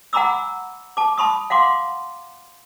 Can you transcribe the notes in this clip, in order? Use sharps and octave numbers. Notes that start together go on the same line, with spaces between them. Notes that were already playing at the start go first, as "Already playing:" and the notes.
F#5 G#5 A#5 B5 D6 E6
A5 D6
A5 B5 C#6 D#6
F5 F#5 C6 D6